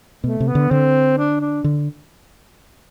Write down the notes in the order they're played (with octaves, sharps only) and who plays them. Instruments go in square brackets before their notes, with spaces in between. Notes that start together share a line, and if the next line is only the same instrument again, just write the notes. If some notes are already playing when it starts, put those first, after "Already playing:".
[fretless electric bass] B2 [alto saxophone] A3
[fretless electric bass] C3
[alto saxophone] B3
[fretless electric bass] D3
[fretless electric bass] D3 [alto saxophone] C4
[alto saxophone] D4
D4
[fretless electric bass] D3